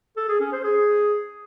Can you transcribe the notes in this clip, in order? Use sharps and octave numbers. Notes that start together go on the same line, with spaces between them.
A4
G#4
C#4
C5
G#4